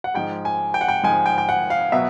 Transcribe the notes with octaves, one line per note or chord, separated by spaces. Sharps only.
F#5
G#2 F3 G#3 G5
G#5
G5
F#5
G5
G#2 F3 G#3 G#5
G5
G5
F#5
F5
B2 F#3 B3 E5